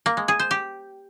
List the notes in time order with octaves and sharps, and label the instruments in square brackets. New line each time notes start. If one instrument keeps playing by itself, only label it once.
[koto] A#3
G#3
G#4
C5
G4